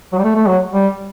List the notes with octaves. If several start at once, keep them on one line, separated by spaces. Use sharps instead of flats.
F#3
G3
A3
A3
F#3
G3